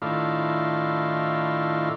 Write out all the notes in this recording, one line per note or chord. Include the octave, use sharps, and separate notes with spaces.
A2 D#3 D4 E4 F4